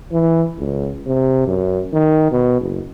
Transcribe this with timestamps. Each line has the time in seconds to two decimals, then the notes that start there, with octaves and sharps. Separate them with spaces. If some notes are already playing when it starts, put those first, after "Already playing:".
0.12 E3
0.58 C#2
1.06 C3
1.47 F#2
1.93 D#3
2.32 B2
2.61 F#1